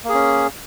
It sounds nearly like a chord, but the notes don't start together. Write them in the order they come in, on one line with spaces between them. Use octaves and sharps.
A#3 G#4 C#4